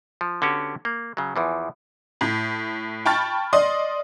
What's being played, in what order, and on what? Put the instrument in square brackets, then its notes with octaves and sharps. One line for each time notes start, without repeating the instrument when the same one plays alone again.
[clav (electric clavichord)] F3
D3 B3 C#4 F#4 G4
A#3
C#3 F#3
E2 E3 F3
[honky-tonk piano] A2
G5 A5 B5 C#6 F6 A6
D5 D#5 C6 D#6